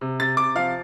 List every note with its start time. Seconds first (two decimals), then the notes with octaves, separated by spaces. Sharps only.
0.01 C3
0.20 C3 A6
0.37 C3 D6
0.55 F3 F5